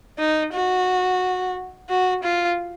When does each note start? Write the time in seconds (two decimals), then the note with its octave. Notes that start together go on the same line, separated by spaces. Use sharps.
0.19 D#4
0.54 F#4
1.90 F#4
2.24 F4